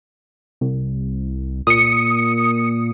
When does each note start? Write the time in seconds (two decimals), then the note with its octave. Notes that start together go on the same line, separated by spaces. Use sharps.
0.61 C2
1.67 A#2 D#6 C#7